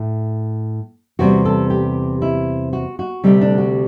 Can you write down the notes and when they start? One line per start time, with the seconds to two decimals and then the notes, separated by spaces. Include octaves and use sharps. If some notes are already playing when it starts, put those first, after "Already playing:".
Already playing: A2 A3
1.19 E2 C3 G3 F#4
1.45 A4
1.70 G4
2.22 E4
2.73 F#4
2.99 F#4
3.24 D2 C3 G3 A3
3.41 D4
3.58 F#4